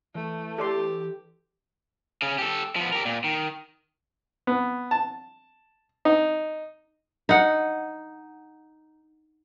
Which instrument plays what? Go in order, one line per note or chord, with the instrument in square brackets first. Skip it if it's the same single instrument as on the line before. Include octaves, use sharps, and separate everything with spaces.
[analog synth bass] E3 [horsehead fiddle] A3
[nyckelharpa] G4 [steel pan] A4 D5 C6
[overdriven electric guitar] C#3 C#4
G4 A4
F3 B3
G4 A#4
A#2
D#3
[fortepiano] B3
A5
D#4
[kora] D#4 F#5